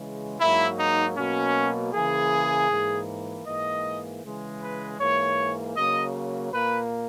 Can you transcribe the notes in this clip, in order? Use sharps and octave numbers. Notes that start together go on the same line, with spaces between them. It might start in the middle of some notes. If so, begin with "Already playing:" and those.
Already playing: C#3 E3 G#3
G#2 F#3 A#3 E4
D#4
B2 F#3 A#3 C#4
C#3 E3 A#3 G#4
G#2 E3 A#3
G#2 E3 A#3 D#5
C#3 E3 G#3
B4
G#2 E3 A#3 C#5
C#3 F#3 A#3 D#5
A#2 A#3 B4